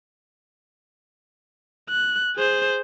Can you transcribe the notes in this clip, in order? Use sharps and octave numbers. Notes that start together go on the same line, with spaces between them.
F#6
G#4 C5